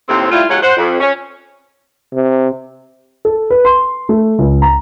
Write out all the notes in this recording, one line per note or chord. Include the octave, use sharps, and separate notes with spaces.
D#2 A2 C4
G3 A3 E4 F4
D#2 F#3 G#3 F4 C#5 F#5
C5 F#5
F2
C#4
C3
A4
B4
C6
A3
C#2
A#5